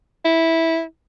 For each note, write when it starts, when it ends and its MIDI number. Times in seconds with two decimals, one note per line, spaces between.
0.25 0.82 64